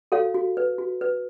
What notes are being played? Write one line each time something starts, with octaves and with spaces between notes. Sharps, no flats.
F#4 A4 C#5 F5
F#4
B4
F#4
B4